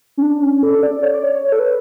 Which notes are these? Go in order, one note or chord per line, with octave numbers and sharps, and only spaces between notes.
C#4
D4
C#4
A4
D5
C#5
D5
C#5
C#5
A4
B4